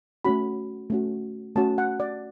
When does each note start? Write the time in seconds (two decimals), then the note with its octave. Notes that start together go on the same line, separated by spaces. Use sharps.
0.25 A3 C#4 F#4 B5
0.90 A3 C#4 F#4
1.56 A3 C#4 F#4 A5
1.78 F#5
2.00 D5